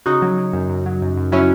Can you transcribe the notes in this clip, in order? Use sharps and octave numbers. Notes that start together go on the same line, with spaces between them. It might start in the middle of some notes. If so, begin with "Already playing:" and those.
C#3 D#4 F#4
F#3
F#3
F#2
F#2
F#3
F#2
F#2
F#3 C#4 E4